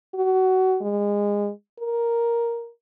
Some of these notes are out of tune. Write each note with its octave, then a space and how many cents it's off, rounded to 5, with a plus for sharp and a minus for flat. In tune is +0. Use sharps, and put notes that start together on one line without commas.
F#4 +25
G#3 -25
A#4 +5